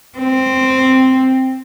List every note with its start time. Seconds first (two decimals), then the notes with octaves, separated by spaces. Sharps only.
0.19 C4